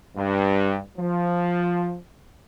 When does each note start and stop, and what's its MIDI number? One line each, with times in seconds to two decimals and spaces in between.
0.16 0.78 43
0.98 1.96 53